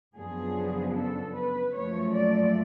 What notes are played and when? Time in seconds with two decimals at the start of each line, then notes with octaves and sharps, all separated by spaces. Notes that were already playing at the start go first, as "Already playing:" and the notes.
0.16 F#2 C#3 F3 B3 D4 G#4
0.95 A4
1.36 B4
1.75 F#2 F3 A3 C#5
2.15 D5